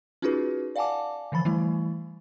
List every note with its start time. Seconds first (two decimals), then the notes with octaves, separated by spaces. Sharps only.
0.22 C#4 D#4 F4 F#4 G#4 B4
0.76 D5 F5 F#5 G#5 A5 D6
1.32 D3 E3 F3 B5 A6
1.45 E3 G3 A3 E4